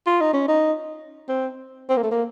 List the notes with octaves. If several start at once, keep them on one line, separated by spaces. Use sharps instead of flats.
F4
D#4
C#4
D#4
C4
C4
A#3
A3
A#3